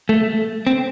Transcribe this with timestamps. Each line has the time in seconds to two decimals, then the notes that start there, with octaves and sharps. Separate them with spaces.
0.09 A3
0.67 C4